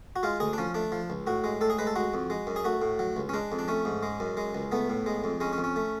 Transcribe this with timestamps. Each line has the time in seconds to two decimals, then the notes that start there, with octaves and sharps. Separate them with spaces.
0.16 F#4
0.23 G#3 F4
0.40 D2 G#4
0.53 D4
0.58 F3 C#4
0.74 A3 D4
0.92 F3
1.10 C#2
1.27 A2 F#4
1.44 G#3
1.61 A2 A4
1.70 G#4
1.79 G#3 B4
1.87 A4
1.96 G#3 F#4
2.14 F2
2.30 G#3
2.47 F#2
2.56 G#4
2.65 A3 F#4
2.82 A2
2.99 F#3
3.16 C#2
3.29 C#4
3.34 G#3 D4
3.52 F2
3.59 D4
3.68 A3 C#4
3.85 G#2
4.03 G#3
4.20 F#2
4.37 G#3
4.55 C#2
4.72 A3 B3
4.89 A2
5.06 G#3
5.24 F2
5.40 G#3 C#4
5.53 C#4
5.58 F2
5.64 C#4
5.76 A3